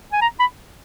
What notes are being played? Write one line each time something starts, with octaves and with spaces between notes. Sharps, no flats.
G#5
A#5
B5